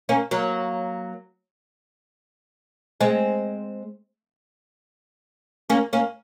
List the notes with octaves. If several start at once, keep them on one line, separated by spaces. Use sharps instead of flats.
A#3 C#4
F#3 A#3
G#3 C4
A#3 C#4
A#3 C#4